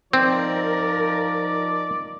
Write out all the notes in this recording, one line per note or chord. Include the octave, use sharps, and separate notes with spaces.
F3 C4 D#4 A#4 D5